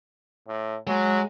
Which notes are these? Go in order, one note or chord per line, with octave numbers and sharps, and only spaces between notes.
A2
F#3 G#3